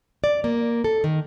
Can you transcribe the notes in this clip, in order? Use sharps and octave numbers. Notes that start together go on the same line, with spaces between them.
D5
A#3
A4
D#3